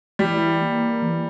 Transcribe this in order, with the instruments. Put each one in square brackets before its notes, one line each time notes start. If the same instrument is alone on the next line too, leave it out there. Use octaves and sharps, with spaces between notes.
[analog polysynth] E3 [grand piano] G3
[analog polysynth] A#3
E3